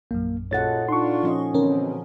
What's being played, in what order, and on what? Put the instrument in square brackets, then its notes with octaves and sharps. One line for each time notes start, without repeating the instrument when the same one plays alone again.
[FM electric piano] A#1 F#2 [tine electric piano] A#3
[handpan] A#2 A4 F#5 [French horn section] C#3 D#4 F4 [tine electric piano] C#5 A6
[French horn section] D4 F4 [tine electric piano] D#4 [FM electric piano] C6 C#6
[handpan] F3 C#4 D#5
[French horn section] B2 C4 [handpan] D3 E3 [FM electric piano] C#4 A#4